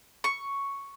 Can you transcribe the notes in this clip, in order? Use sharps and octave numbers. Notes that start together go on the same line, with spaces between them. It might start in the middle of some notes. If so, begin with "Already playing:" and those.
C#6